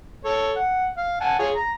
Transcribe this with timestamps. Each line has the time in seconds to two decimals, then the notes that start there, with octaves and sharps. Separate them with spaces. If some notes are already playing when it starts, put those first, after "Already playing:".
0.25 A4 C#5
0.56 F#5
0.97 F5
1.21 F#5 G#5 A5
1.39 F4 G#4 C#5
1.55 A#5